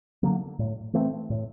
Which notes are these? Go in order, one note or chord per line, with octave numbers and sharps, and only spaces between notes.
D3 F#3 A#3
A2
E3 A3 C4
A2